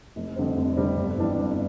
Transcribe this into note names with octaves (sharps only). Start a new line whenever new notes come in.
F1
F2 D3 G3 C4
F1
F2 D3 G3 C4
G1
F2 E3 G3 D4
G1